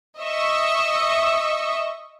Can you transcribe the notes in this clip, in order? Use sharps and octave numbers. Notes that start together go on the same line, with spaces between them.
D#5 E5 C#6